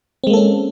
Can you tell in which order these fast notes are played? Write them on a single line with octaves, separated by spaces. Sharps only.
C4 G#3 A#3 A4 C#4